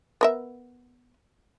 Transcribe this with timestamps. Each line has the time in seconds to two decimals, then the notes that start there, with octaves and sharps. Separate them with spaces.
0.21 B3 A#4 E5